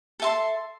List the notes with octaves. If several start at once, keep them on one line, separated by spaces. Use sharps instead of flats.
A4 E5 A5 C6